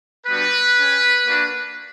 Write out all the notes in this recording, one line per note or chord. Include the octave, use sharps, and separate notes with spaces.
G3 B3 D4 F#4 B4
C#4 G4
A#3 D4 F#4